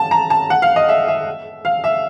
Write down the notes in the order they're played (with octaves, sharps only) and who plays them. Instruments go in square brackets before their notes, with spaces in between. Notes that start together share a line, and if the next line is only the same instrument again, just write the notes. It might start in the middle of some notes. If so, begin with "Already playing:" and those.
Already playing: [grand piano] A5
A#5
A5
F#5
F5
D#5
E5
E5
F5
E5